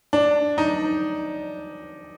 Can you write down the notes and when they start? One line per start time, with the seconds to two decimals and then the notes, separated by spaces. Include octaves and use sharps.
0.13 D4
0.58 D#4